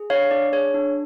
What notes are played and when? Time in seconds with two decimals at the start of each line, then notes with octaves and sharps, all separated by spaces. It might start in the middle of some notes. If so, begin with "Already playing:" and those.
Already playing: G#4
0.10 D4 C#5 F5
0.31 D4 D5
0.52 G#4 C#5
0.74 D4